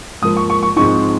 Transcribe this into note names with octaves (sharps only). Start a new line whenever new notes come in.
G#2 F3 A#3 D#6
C#6
C#6
C#6
G#2 F3 G#3 C4 D#4 C#6